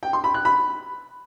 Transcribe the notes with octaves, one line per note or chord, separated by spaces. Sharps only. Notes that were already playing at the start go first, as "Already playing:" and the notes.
G5
C6
B5
F#6
B5